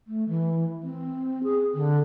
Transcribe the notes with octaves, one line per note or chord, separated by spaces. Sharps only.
A3
E3
C4
G#4
D3